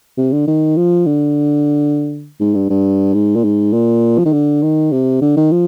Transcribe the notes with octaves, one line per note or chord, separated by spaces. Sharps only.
C3
D3
D#3
F3
D3
G#2
G2
G2
G#2
A#2
G#2
A#2
F3
D#3
D3
D#3
C3
D3
D#3
F3